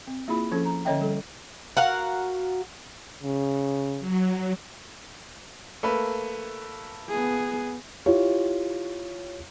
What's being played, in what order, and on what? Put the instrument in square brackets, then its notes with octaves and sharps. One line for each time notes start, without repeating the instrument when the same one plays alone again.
[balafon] C4
A#3 E4 F4 G#4 B5
F3 C#4 A4
A#5
D3 C#4 C#5 D#5 E5 G5
G3 A4
[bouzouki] F#4 A#4 F5 F#5
[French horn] C#3
[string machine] F#3
[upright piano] A3 A#3 B4
[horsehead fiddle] B3 G#4
[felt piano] E4 F4 G4 C#5